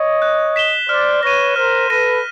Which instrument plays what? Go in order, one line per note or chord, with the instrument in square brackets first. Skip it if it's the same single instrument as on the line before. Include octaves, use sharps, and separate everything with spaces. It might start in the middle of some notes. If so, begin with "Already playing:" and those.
Already playing: [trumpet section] C#5 D#5
[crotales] F#6
B6 E7 G7
[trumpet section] C5 D5 [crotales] F6
[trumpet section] B4 C#5 [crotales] A#6 D#7
[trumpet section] A#4 C5 [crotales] F6
[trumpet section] A4 B4 [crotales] A#6 D#7